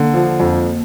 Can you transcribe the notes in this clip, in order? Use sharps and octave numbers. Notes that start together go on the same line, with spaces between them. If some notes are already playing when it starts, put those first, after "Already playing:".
Already playing: D3 A#3
F3
F2